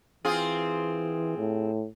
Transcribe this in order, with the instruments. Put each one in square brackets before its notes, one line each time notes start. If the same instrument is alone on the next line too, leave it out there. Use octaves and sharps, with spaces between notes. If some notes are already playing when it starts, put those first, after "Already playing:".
[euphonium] E3 [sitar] C4 F4 G#4
[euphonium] A2